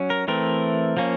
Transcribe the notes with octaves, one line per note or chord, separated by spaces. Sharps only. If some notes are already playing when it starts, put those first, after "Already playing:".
Already playing: F#3 C#4
A#4
E3 A3 C4 A#4
F3 A#3 C#4